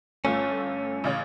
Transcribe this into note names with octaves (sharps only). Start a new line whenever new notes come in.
G1 A3 C#4 F4
A1 C#3 C#5